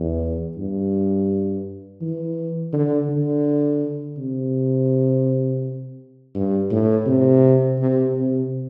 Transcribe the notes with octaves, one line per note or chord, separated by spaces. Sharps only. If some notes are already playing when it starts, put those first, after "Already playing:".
Already playing: E2
G2
E3
D3
D3
C3
G2
A2
C3
C3
C3